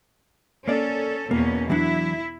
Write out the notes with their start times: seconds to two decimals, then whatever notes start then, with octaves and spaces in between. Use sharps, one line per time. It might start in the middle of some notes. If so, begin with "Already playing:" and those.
0.68 A#3 C#4 A4 D5
1.31 E2 B2 A#3 C#4
1.70 E3 F#3 D4 E4